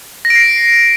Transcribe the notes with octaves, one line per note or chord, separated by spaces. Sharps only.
A#6
D7
C7